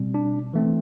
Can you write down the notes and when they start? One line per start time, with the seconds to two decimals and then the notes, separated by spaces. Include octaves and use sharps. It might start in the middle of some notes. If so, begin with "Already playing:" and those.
Already playing: B2 G3 C4
0.14 D4
0.53 E3 A3 C4